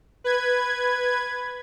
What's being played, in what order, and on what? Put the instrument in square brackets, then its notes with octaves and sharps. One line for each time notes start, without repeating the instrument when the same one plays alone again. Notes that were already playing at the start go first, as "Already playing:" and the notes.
[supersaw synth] B4 G#6